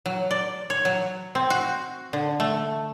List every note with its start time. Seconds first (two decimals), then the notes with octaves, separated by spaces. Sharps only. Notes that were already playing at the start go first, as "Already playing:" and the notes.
0.06 F#3
0.31 D5
0.70 C#5
0.85 F#3
1.35 C4
1.50 F#4
2.13 D3
2.40 A3